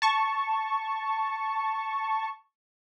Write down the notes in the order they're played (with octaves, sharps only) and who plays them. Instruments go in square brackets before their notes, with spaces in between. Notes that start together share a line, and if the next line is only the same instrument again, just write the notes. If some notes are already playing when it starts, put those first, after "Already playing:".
[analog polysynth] A5 C#6